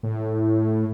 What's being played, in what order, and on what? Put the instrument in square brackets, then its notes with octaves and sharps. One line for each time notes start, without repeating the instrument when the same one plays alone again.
[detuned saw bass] A2